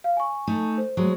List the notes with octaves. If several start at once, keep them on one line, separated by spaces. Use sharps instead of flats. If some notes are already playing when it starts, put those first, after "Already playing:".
F5
G#5 C#6
A3 D#4 A4
C5
F#3 G#3 A3